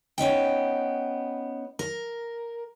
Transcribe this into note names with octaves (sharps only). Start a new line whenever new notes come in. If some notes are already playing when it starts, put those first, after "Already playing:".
B3 C#4 D#4 G5
A#4